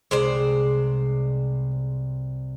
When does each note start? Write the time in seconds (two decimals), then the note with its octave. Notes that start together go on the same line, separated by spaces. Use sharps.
0.11 C2 C3 G#3 C5 D5